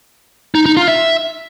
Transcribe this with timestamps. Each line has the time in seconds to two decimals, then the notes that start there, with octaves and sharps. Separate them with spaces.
0.55 D#4
0.66 D#4
0.77 F4
0.88 E5